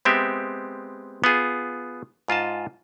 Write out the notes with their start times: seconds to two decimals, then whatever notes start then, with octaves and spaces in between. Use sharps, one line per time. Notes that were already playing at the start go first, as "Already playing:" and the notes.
0.05 G#3 B3 C4 G4 E5
1.24 B3 F4 G#4
2.28 G#2 F4 D#5 A5